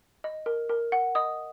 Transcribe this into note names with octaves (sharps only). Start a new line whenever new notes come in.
D#5
A#4
A#4
F#5
D#5 D#6